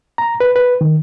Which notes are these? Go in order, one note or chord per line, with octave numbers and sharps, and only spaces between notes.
A#5
B4
B4
D#3